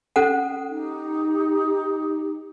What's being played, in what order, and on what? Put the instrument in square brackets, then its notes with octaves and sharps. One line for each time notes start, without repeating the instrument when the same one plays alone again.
[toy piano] C#4 A4 F#5
[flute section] D#4 G4